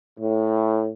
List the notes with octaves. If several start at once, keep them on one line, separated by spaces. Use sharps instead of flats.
A2